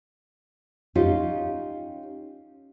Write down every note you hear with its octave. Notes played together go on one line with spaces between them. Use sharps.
C#4 D#4 F4 G4